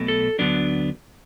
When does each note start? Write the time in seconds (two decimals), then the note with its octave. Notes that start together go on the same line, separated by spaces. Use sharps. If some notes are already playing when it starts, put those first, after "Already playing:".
Already playing: B1 B2 A3
0.08 A4
0.39 D2 D3 F#3 B3 D4